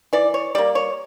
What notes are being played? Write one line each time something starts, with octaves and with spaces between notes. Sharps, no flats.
E3 D5
C#5
G3 A#3 D5
C#5